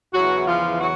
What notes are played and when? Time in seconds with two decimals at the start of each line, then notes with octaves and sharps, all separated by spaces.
0.13 E2 C#3 E3 F#3 F#4
0.46 F3 F4
0.79 F#3 F#4